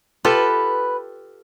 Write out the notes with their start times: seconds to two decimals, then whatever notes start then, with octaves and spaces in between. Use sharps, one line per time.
0.25 F4 G4 A4 B4